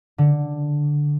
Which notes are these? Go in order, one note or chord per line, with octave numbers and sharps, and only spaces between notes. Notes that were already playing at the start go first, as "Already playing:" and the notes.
D3